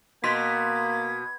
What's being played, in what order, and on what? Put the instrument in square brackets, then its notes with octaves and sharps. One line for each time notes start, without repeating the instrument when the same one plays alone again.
[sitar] B2 [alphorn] A#3 [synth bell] C6 B6 [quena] G#6